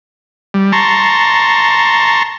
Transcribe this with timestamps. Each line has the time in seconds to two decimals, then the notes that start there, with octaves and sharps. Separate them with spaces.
0.54 G3
0.72 A5 A#5 C6 C#6